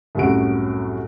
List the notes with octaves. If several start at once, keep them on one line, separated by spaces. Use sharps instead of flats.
C2 F#2 A2 F#4 D7